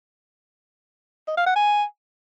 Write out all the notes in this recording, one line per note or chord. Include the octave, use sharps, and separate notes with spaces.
D#5
F5
F#5
G#5